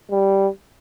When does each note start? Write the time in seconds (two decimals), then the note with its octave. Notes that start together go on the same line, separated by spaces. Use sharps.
0.11 G3